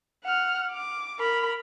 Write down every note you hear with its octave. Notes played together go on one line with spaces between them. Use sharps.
F#5 F6
D6
A#4 B5